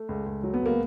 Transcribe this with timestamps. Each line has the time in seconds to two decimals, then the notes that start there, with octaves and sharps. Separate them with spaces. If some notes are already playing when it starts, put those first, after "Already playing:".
Already playing: A3
0.09 C#2
0.26 C#2
0.43 F#3
0.54 B3
0.61 C#2 A#3